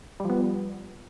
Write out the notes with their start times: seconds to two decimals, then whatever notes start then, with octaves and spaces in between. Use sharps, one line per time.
0.20 G3
0.25 F3
0.30 B3